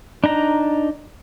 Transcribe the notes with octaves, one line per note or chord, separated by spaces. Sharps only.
D4 D#4 A#5